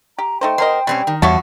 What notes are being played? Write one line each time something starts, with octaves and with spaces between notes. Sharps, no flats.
G4 A#5
A3 D#4 C5 G5
B2 A#4 C5 D#5
B2 G3 C4 C#4
D#3
E2 G2 F3 G3 F#4 C#5 E5 A5